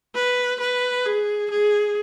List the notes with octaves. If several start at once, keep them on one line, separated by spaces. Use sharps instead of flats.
B4
B4
G#4
G#4